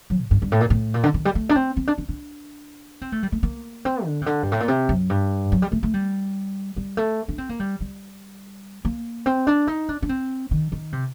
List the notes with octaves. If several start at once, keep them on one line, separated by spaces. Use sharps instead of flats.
F#3
A2
G2
G2
A2
A#2
A2
A#2
D3
D#3
G3
A3
D4
C4
C4
D4
D4
D4
C4
A3
G3
A3
A#3
C4
D3
C3
D3
G2
A2
A#2
C3
F#2
G2
F#3
G3
A3
A3
G3
G3
A3
D4
C4
A#3
G3
G3
A#3
C4
D4
D#4
D4
D4
C4
D#3
D#3
C3